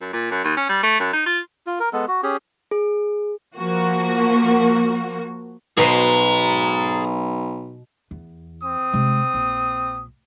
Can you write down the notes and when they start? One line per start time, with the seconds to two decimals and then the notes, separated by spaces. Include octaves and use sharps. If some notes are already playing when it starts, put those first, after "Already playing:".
0.01 F#2
0.13 A#2
0.31 F#2
0.44 D#2
0.57 C#4
0.69 G3
0.83 A3
1.00 F#2
1.13 D#4
1.26 F4
1.67 F4
1.80 A#4
1.93 G#3 B3 A4
2.08 F#4
2.23 C#4 G4 G#4
2.71 G#4
3.57 F3 A#3 F#4
5.77 B1 B2 G#4 B4 C5 A#5
8.11 E2
8.63 C4 D#6
8.93 C3 G#3
9.34 A#1